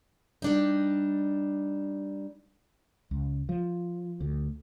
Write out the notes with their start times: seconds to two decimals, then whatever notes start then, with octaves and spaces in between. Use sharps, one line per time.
0.42 G3 D4 D#4
3.11 C#2
3.49 F3
4.21 D2